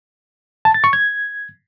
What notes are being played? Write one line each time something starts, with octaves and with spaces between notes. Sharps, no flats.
A5
A6
C#6
G#6